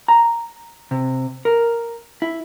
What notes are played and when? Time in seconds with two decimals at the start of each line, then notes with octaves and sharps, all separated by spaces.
0.08 A#5
0.91 C3
1.45 A#4
2.22 E4